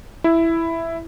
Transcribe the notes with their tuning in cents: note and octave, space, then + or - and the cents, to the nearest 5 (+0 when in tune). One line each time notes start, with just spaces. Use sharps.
E4 +5